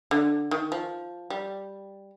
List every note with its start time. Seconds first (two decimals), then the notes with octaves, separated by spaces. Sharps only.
0.11 D3
0.51 D#3
0.72 F3
1.30 G3